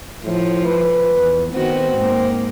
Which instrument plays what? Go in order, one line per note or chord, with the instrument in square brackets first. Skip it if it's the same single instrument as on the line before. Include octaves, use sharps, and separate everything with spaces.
[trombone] A2 [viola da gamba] F3
[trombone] B4
[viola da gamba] E2
[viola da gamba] D#3 B3 F#4 [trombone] C4
[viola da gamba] G#2 A#3